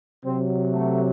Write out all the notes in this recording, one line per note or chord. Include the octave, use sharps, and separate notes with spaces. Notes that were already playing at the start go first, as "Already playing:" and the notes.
C3 F#3 C4
A3